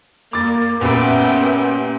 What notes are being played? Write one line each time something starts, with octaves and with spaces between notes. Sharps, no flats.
A#3 D6 A6
A#2 B3 C#4 G4 B4 E5 G5